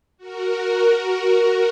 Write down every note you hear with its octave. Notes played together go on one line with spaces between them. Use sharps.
F#4 A#4